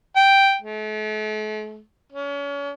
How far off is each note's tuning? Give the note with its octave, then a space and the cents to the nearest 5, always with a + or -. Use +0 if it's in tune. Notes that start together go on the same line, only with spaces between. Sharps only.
G5 +0
A3 -45
C#4 +35